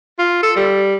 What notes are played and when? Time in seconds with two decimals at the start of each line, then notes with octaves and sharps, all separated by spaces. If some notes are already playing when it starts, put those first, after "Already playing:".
0.19 F4
0.43 A4
0.56 G3